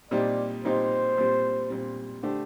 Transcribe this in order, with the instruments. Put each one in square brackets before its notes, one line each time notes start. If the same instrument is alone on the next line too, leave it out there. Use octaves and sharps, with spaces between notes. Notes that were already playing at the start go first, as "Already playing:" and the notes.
[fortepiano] A#2 G3 C4 D#4 G4 [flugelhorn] D5
[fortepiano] A#2 G3 C4 D#4 G4 [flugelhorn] C5
[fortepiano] A#2 G3 C4
A#2 G3 C4
D3 A3 D4 G4 C5